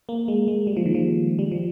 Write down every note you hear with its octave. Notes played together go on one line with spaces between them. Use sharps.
A#3
G#3
G#3
G3
F3
D#3
F3
G3
F3